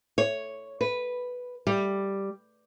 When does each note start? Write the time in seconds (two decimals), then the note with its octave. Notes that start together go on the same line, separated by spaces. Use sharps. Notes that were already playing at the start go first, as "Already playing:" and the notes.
0.18 C#5
0.81 B4
1.67 G3